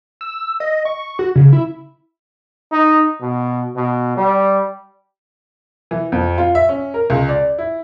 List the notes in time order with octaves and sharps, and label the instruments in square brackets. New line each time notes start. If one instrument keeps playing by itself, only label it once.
[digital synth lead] E6
D#5
C#6
F#4
C#3
E4
[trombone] D#4
B2
B2
G3
[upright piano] E3
F2
F4
E5
C#4
A#4
C#2
D5
E4